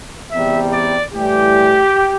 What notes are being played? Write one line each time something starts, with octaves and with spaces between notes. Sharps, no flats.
E2 C3 G3 E5
D5
A2 E3 G3 G4